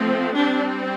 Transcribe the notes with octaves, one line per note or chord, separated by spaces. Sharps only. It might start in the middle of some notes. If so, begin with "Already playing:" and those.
Already playing: F3 A3 C4
G3 C4 D4